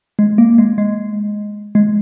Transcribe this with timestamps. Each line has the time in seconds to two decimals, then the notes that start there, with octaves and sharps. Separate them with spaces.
0.19 G#3
0.38 A#3
0.58 G#3
0.78 G#3
1.75 G#3